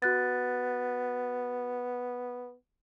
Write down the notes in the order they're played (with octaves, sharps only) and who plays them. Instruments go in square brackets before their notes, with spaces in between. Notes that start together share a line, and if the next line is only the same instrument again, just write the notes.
[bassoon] B3 [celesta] F#4 F#6 A6